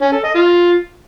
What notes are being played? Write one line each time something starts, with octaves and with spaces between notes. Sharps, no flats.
C#4
A4
D#5
F4